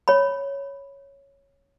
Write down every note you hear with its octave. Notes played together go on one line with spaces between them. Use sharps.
C#5 B5